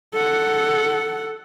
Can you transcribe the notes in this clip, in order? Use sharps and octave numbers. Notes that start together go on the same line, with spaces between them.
A4 F#5